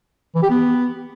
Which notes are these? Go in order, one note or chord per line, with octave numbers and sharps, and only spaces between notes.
E3
G4
B3